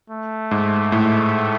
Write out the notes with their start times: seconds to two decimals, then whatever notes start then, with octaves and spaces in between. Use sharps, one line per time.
0.10 A3
0.51 G#2
0.92 A2